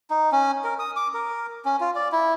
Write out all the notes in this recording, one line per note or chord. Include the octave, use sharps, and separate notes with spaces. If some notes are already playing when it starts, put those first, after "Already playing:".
D#4
C#4
A#4
D#6
D6
A#4
C#4
F4
D5
E4